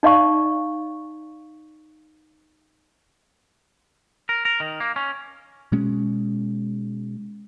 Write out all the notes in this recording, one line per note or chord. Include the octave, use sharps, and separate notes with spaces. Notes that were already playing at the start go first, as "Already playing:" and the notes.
D#4 D5 F5 C#6
A#4
A#4
D#3
A#3
C#4
B2 G#3 C#4